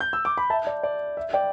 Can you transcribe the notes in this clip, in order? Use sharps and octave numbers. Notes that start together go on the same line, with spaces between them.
G6
E6
D6
B5
E5 A5
D5
D5
E5
D5 G5